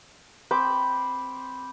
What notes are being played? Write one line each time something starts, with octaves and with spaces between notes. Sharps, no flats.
C4 C5 B5 D6